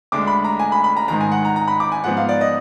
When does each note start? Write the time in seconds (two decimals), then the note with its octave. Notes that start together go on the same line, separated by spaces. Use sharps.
0.12 D2 D3 G#3 D6
0.27 B5
0.44 A#5
0.59 G#5
0.72 B5
0.84 B5
0.97 A#5
1.08 G#2 D#3 G#3 A#5
1.21 G#5
1.32 F#5
1.45 A#5
1.56 A#5
1.68 B5
1.80 D6
1.92 G#5
2.04 G#2 F3 B3 F#5
2.17 F5
2.29 D5
2.41 D#5